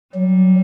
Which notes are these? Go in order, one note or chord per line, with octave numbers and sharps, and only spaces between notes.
F#3 G3